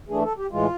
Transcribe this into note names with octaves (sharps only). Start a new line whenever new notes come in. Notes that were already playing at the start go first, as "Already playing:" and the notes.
E3 A3 D4 G#4
A4
G4
A2 E3 G#3 F4